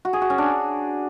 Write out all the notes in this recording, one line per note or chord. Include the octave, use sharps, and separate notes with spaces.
F#4
G#4
F#4
C#4
D4